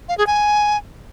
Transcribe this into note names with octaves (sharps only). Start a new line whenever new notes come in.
F5
G#4
G#5